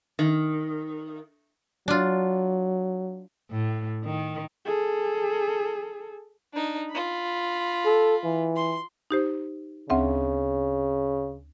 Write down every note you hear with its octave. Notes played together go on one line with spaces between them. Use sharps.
D#3
F#3 D4 F4
A2
D#3
G#4 A4
D4 D#4
F4 B5
A4
E3
C6
D#4 G4 C5
D2 C#3 C4 E5